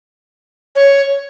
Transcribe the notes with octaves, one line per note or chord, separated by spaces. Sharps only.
C#5